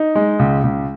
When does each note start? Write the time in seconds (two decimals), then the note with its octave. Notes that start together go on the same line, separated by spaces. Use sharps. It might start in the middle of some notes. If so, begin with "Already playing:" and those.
Already playing: D#4
0.15 G#3
0.39 C#2
0.63 C#2